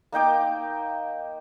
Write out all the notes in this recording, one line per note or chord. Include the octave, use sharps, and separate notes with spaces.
A#3 D#4 G5 D6